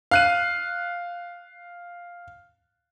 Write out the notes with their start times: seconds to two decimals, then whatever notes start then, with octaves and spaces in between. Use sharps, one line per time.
0.11 F5 F#6 D#7